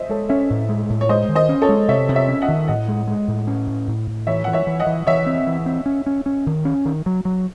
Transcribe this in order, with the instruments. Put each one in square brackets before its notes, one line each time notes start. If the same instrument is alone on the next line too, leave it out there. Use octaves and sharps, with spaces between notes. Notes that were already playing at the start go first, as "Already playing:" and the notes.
Already playing: [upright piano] C5 D#5 E5
[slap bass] G#3 [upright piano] A4 C#5
[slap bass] C#4 [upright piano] C#5 E5
[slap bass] A2
G#3
A2
[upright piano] C#5
[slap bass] G#3 [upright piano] C5 D#5
[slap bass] D#3
[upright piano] C5 D#5
[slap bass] C#4
[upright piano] A4 C#5
[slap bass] G#3
[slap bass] C3 [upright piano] C#5 E5
[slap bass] C3
[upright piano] C#5 E5
[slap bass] C#4
[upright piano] D#5 F#5
[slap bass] D#3
[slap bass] A2 [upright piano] D#5 F#5
[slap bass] G#3
G#3
A2
C#4
A2
A2
A2
[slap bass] E3 [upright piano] C#5 E5
[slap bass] E3 [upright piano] F#5
[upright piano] C#5 E5
[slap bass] E3
[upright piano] D#5 F#5
[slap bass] E3
[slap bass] E3 [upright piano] C#5 E5
[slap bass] C4
E3
C4
C#4
C#4
C#4
D#3
C#4
D#3
F#3
F#3